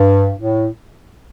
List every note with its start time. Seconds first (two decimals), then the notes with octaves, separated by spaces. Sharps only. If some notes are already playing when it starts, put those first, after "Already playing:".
Already playing: G2
0.37 A2